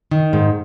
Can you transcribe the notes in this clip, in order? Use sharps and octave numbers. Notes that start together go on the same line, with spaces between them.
D#3
G#2